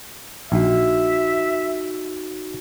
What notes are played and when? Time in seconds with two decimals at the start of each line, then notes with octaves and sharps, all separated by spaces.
0.52 A#1 D#4 F#4 E5